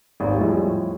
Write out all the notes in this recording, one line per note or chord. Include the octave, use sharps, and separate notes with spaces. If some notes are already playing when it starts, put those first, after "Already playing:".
G#1 D#2
E2 A2 F3 G3 G#3 E4